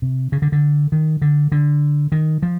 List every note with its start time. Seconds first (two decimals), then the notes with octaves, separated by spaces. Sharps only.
0.02 C3
0.32 C#3
0.42 D3
0.52 D3
0.92 D#3
1.22 D3
1.52 D3
2.12 D#3
2.42 F3